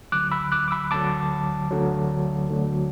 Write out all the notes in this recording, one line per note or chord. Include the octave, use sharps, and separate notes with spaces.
D2 D3 F#3 D6 F#6
B5 E6
D6 F#6
D6
B5 E6
D2 D3 F#3 A5 D6
D2 D3 F#3
D2 D3 F#3